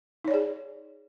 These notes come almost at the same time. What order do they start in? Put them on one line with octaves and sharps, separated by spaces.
D#4 C#5 D5 G#4